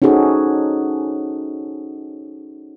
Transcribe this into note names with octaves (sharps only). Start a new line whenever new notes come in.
C#4 D#4 F#4 G#4 A4 C5